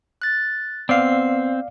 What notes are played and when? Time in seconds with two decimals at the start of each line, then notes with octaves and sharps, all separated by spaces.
0.22 F#6 A6
0.89 B3 C4 D5 F5 C7